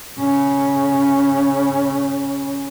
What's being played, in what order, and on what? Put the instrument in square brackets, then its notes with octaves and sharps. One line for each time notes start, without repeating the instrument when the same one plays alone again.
[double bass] C#3 C#4